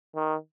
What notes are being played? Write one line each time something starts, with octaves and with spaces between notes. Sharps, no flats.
D#3